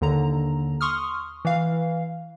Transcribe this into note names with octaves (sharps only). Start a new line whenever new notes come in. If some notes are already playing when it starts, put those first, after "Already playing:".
D#2 D3 A#5
C6 C#6 D#6 F6
E3 F5